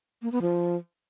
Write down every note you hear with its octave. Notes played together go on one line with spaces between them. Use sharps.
A#3
B3
F3